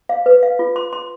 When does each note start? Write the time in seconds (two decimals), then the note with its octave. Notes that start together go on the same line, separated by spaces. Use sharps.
0.09 F5
0.26 B4
0.43 F5
0.59 F4
0.76 C6
0.93 C6